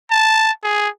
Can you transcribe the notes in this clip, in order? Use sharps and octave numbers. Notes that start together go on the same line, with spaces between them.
A5
G#4